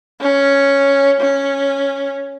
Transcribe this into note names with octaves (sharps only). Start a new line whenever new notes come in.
C#4
C#4